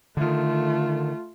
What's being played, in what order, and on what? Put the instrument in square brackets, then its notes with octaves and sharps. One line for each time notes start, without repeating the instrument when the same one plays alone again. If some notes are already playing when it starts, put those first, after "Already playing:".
[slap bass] D3 D#3 [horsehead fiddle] A3 F4